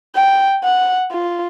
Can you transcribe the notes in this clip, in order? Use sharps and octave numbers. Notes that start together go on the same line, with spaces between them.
G5
F#5
F4